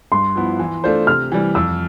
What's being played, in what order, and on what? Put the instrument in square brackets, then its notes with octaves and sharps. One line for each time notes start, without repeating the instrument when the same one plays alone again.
[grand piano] G2 [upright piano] C6
[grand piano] F3 B3 E4
E3
A3 D4 F4 C5
[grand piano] C3 [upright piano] F6
[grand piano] E3 G3
[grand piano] F2 [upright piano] E6